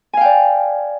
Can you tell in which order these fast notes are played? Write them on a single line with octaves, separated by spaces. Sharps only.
G#5 F5 G5 D5